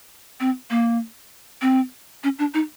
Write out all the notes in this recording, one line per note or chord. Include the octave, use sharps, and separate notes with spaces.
C4
A#3
C4
C#4
D4
D#4